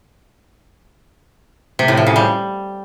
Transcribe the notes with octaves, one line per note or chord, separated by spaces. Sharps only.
C3
A2
F3
C#3
G3